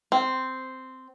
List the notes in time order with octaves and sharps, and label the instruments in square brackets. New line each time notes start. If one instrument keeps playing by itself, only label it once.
[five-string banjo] C4